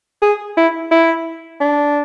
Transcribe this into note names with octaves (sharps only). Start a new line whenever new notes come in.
G#4
E4
E4
D4